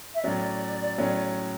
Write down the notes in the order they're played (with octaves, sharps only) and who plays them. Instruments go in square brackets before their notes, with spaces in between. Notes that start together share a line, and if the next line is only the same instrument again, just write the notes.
[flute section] E5
[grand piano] A2 F#3 C#4 [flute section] D5
[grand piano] A2 F#3 C#4